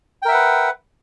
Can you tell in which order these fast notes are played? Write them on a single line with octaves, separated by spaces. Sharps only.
G5 A#4 E5 F#5 B4